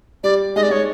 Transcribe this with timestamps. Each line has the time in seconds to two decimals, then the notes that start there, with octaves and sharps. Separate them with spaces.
0.24 G3 D5
0.56 G#3 D#5
0.63 D5
0.71 G#3 C#5